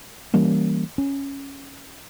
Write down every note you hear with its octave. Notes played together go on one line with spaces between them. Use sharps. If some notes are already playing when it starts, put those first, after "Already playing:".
E3 G3 A#3 C#4
C#4